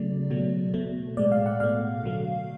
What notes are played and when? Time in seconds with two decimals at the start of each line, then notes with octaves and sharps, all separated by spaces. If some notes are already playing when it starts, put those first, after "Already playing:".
Already playing: C#3 F#3 A3 D5
0.30 B2 F#3 A3
0.74 B2 A3
1.17 A2 G#3 D5
1.32 F5
1.46 F#5
1.60 B2 A3 F5
2.04 D3 F#3 A3